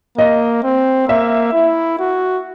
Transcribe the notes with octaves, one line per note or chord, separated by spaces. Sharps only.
A#3 D#5
C4
A#3 E5
E4
F#4